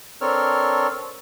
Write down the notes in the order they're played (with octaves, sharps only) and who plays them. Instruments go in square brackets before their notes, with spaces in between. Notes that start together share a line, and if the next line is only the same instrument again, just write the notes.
[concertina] C4 D4 A4 A#4 C#5 F6